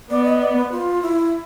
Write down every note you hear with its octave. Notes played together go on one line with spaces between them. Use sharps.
B3 D5
D#5
D5
B4
F4
E4